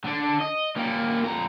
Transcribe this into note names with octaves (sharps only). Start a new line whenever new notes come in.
D3 D4
D#5
G3 A#3
F2 A#5